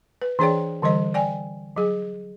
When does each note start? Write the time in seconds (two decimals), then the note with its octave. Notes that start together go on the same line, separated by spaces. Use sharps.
0.22 B4
0.39 E3 D4 G#4 C#5 D5 G5
0.82 D3 E3 G3 C5 D#5
1.14 D5 G5 G#5
1.76 F#3 G#4